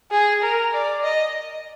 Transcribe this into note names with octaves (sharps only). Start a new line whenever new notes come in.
G#4
A#4
D5
D#5